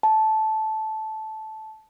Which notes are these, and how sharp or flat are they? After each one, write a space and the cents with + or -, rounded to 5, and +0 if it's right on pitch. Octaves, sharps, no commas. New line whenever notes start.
A5 -10